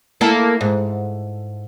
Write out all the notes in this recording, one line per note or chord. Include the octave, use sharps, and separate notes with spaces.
A#3 E4 A4
G#2